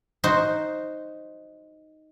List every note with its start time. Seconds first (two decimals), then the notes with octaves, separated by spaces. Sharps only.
0.24 D#4 F#4 C5